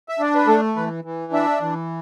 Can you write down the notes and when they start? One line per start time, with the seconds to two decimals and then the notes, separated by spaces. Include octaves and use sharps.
0.09 E5
0.19 D4 D5
0.35 B4
0.47 A3 A4
0.76 E3 B4
1.04 E3
1.33 D4 E5
1.61 E3